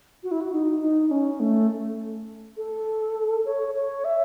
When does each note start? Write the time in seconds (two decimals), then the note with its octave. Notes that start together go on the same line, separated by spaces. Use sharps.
0.23 F#4
0.31 E4
0.41 F#4
0.52 D#4
0.82 D#4
1.11 C#4
1.40 A3
2.57 A4
3.45 C#5
3.75 C#5
4.04 E5